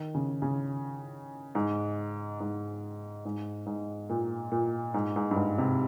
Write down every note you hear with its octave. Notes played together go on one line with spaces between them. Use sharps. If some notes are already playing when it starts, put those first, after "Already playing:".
Already playing: D#3
C#3
C#3
G#2
G#2
G#2
G#2
A#2
A#2
G#2
G#2
G2
G#2
C3